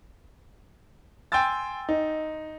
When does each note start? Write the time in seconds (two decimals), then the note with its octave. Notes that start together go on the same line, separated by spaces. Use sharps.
1.32 G5 G#5 C6 E6 A6
1.89 D#4